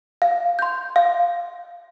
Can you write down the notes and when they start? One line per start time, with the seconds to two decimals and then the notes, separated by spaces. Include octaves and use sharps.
0.22 F5
0.59 C6 G6
0.96 F5